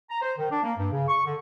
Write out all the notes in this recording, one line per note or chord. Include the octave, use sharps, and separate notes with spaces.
A#5
C5
D#3
D4
A#3
G2
C#3
C#6
D3